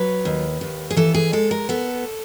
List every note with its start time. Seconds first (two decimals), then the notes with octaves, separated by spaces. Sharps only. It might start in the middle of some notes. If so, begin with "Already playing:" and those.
Already playing: F#3 B4
0.25 D#2
0.61 D#2
0.90 G#4
0.97 E3 A4
1.14 G#4
1.33 G#3 A4
1.51 A#4
1.69 B3 A4